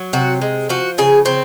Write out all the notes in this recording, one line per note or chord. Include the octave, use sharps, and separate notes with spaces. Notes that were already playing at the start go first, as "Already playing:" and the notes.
Already playing: F#3
C3 F#4
G#3
F3 F#4
C#3 G#4
C#3 C4